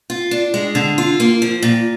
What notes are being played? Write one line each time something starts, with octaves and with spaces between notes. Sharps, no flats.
F4
D4
G#3
D3
F4
A#3
F3
A#2